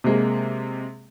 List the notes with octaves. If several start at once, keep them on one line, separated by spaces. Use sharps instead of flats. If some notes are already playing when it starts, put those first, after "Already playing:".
C3 G#3 A#3